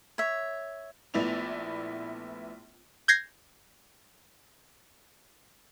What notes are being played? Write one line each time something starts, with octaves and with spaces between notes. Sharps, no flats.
C#5 E5
A#1 A3 B3 E4 D5 F7
G6 G#6 A#6 C7